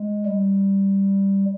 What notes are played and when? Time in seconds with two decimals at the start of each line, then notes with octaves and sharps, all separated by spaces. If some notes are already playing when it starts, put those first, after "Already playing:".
Already playing: G#3
0.26 G3